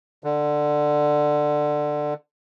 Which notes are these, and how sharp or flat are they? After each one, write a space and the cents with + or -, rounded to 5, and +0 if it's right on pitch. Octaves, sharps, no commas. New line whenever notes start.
D3 +15